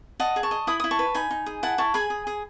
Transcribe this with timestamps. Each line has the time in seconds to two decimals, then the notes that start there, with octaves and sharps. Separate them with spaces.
0.20 D#5 F#5 A5
0.36 G#4
0.43 A5 C#6
0.51 D#5
0.67 E4 B5 D#6
0.80 E4 D#6
0.91 A5 C#6
0.99 B4
1.14 D#4 G#5 B5
1.31 D#4
1.46 G#4
1.63 E4 F#5 A5
1.78 E4 A5 C#6
1.94 G#4 G#5 B5
2.10 G#4
2.27 G#4